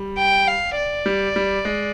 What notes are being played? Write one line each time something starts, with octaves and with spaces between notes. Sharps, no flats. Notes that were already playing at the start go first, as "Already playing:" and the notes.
Already playing: G3
G5
F5
D5
G3
G3
G#3